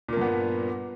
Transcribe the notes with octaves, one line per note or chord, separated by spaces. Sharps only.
G2 A#2 A#3 B3